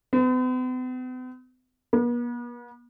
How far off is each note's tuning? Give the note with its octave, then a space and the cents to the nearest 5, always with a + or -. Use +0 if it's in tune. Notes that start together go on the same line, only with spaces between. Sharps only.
B3 +45
B3 -45